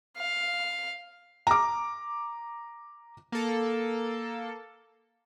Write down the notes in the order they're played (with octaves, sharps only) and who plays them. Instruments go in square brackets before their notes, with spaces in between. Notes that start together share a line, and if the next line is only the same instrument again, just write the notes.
[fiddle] F5
[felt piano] A#5 D6
[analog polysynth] A#3 A4